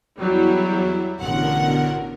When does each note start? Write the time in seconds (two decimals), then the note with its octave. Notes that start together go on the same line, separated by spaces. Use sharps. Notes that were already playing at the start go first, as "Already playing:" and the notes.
0.18 E2 F#3 G3 E4
1.18 A1 B2 D3 A#4 F#5